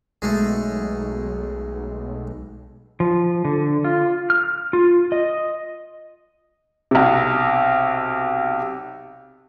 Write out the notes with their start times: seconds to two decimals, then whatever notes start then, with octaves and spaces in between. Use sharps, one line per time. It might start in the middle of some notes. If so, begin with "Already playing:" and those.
0.22 B1 G#3 A3
3.00 F3
3.45 D3
3.84 F4
4.30 F6
4.73 F4
5.12 D#5
6.91 B1 C3